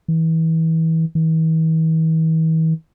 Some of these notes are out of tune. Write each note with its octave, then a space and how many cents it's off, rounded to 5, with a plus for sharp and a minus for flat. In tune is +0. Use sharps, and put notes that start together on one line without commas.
E3 -30
E3 -45